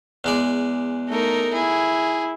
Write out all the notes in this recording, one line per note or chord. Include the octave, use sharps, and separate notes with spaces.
E2 G#3 D5
A3 D#4 A#4
E4 G#4